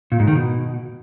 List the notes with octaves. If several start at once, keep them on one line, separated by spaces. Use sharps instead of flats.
A#2
G#2
D#3
B2